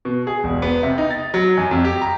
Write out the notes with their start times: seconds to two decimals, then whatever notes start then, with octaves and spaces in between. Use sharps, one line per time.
0.05 B2
0.27 G#4
0.44 E1
0.62 B3
0.83 C3
0.98 D#4
1.10 A6
1.34 F#3
1.58 F#2
1.71 F2
1.84 G4
2.01 A#5